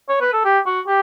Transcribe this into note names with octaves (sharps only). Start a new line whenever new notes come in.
C#5
B4
A4
G4
F#4
G4